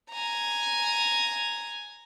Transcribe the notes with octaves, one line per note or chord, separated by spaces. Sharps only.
G#5 A#5